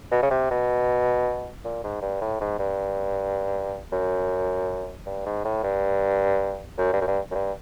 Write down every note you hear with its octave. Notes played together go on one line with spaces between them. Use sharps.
B2
C#3
C3
B2
A#2
G#2
G2
A2
G#2
G2
F#2
G2
G#2
A2
G2
F#2
G2
F#2
G2
F#2
G2